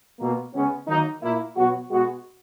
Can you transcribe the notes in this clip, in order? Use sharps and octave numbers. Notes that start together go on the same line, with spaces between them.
B2 A#3
C#3 G#3 B3 C#4
D#3 F#3 A#3 D#4
A#2 A#3 E4
B2 F#3 B3 F#4
B2 G#3 B3 F#4